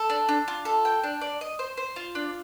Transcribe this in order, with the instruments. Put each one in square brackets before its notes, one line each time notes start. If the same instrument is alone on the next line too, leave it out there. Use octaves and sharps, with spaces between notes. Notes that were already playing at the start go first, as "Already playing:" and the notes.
Already playing: [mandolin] A4
D4
D4
F4
A4
G5
D4
D5
D#5
C5
C5
F4
D4